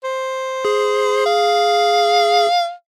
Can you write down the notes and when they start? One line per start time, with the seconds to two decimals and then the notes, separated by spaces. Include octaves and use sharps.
0.04 C5
0.65 G#4
1.26 F5